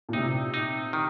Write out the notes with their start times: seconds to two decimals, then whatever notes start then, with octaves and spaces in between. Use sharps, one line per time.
0.09 A#2
0.13 C3 D#4
0.54 D#4
0.93 D#3